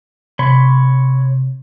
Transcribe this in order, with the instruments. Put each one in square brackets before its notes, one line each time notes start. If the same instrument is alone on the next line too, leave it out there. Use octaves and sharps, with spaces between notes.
[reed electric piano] C3 [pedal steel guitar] C#5 B5 C6